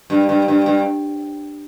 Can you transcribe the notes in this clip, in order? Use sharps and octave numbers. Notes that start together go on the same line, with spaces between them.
G2
G2
G2
G2